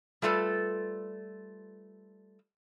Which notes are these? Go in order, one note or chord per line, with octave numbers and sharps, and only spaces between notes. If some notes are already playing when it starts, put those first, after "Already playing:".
G3 A3 F4 A4 B4